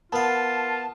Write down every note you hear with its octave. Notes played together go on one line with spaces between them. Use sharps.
B3 F4 A#4 F5 A5